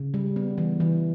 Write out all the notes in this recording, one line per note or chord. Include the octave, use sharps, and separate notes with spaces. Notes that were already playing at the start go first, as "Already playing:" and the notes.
Already playing: C#3
G3
B3
E3
E3